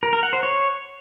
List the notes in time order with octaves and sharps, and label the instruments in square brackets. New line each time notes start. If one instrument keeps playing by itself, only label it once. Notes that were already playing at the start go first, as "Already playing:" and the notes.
[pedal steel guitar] A#4
A#4
F#5
C5
C#5